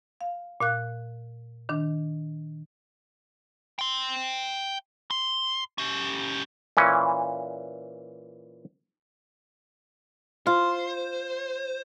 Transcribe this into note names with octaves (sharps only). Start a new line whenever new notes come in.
F5
A#2 F5 F#6
D#3 D4
G5 C6
C6
C#4 G4
A#2 E3 C#4
F4 C5